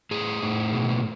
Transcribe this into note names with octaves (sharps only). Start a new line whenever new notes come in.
A2 G#4
A2
B2